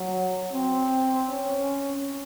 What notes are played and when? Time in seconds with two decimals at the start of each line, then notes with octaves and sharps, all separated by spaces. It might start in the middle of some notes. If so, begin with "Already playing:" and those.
Already playing: F#3
0.52 C4
1.29 C#4